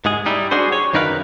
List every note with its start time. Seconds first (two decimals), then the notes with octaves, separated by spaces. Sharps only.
0.05 G#2 G#3 G#4
0.26 G3 D#4 E4
0.51 D4 F#4 G#4 C5
0.72 C#5
0.93 F#2 D#3 D#4 A#4 B4 F5